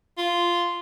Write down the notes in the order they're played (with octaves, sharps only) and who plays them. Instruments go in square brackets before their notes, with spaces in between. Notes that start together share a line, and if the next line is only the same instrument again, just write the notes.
[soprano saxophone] F4